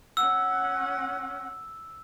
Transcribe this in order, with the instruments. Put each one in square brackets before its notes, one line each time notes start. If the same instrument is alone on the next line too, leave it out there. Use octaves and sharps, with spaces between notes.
[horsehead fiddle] C#4 F#5 [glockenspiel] E6